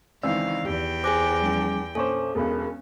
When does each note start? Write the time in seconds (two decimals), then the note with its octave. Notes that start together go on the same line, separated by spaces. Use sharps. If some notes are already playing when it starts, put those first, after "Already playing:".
0.23 C#2 D#3 E3 C4 D5 F5 E6
0.65 E2 G4 G5
1.04 G#4 C5 G#5 D6 F#6 A#6
1.42 F3 G3 C#4
1.95 A#1 C#4 A4 C5 G#5 C#6 D6
2.35 E1 B1 C#4 G#4 A#4 B5